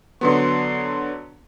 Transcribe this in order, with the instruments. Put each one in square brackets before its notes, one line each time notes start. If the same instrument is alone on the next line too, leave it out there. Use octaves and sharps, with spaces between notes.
[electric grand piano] D3 F#3 B3 [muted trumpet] C6